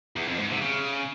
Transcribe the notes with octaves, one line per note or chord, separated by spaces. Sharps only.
E2
F2
G#2
C3
C#3